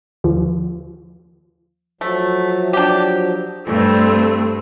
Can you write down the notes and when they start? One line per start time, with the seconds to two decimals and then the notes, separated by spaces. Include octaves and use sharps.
0.24 D#2 F3
2.01 F3 F#3 A3
2.73 D4 G4
3.66 G2 A3 C4